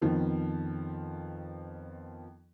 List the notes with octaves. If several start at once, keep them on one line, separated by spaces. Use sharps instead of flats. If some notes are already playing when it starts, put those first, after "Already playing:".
F2 D#3 F3 B3